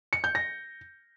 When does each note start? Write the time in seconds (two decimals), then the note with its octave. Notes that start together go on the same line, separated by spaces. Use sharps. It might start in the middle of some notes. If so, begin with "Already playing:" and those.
0.13 C#7
0.24 G6
0.35 A#6